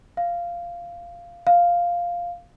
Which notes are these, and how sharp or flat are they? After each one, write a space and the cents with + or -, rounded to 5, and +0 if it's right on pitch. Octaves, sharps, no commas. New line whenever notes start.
F5 -10
F5 +0